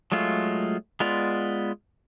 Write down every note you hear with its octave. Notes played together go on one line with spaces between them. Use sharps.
F#3 G#3 A3 F4
G#3 B3 F4 D5